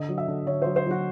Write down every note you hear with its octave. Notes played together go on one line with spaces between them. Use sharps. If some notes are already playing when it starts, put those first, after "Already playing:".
Already playing: D3 D#5
F#3
E5
D3
D3 C#5
F#3 C5
C5
F#3 F#4